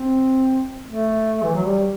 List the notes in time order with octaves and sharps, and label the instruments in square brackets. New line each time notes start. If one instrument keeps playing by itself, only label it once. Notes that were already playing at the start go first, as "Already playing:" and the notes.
Already playing: [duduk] C4
A3
E3
F#3
G3